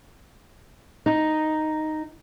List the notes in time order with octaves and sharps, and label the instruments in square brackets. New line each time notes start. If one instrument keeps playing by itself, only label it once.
[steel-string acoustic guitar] D#4